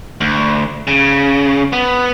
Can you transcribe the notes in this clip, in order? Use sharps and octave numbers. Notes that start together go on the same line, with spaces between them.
D2
C#3
B3